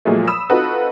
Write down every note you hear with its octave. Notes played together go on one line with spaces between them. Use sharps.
A#2 F3 F#3 G#3 A3
B5 D#6 E6 E7
C4 D#4 F4 F#4 A4 B4